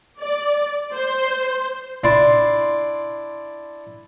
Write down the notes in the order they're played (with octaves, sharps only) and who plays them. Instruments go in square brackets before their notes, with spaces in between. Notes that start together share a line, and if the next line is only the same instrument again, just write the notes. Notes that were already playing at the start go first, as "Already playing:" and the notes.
[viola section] D5
C5
[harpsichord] D4 E4 D5 C6